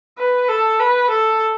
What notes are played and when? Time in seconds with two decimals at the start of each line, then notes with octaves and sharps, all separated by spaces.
0.19 B4
0.49 A4
0.80 B4
1.10 A4